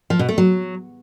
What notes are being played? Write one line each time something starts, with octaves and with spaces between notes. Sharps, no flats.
F3
B2
A3
F#3